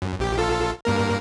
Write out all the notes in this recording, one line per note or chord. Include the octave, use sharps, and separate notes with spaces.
F#2
A#1 G4
A#1 F4 A4
G2 A#3 A#4